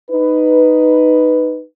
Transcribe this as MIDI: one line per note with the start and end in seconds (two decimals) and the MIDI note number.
0.10 1.63 63
0.10 1.63 71